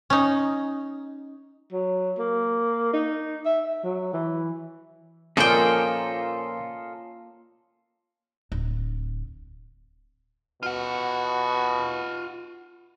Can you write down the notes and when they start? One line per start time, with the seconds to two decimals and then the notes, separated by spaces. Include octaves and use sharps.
0.10 C#4 D#4
1.72 F#3
2.19 A#3
2.93 D#4
3.45 E5
3.66 E5
3.84 F#3
4.13 E3
5.37 A#2 F3 A#3 C#4 F4 A4 D#5 G5
8.52 D1
10.63 B2 F4 F#5